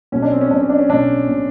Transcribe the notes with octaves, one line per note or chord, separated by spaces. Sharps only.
B1 B2 C#4
D4
C4
C#4
B1 B2 D4
C#4
D4
C#4
B1 B2 D4
B2